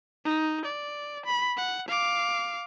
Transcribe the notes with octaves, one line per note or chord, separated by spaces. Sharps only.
D#4
D5
B5
F#5
F5 D6